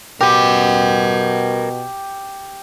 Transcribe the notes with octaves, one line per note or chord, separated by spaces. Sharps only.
B2 G4 A#4 F#5